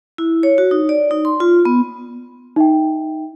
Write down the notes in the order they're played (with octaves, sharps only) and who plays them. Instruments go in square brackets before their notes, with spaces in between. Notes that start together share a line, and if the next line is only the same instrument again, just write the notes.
[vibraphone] E4
C#5
F#4
D#4
D5
D#4
C6
F4
B3
[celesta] D#4 E5 G5